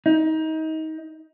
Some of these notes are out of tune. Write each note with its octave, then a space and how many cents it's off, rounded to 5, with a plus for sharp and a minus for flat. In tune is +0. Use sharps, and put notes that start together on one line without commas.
D#4 +25